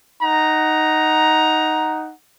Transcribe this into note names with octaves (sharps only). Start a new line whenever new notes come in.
D#4 F#5 A#5